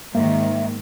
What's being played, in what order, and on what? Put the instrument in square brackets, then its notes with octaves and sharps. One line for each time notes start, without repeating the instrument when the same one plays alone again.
[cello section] G#2 D#3 [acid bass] A#3 [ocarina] E5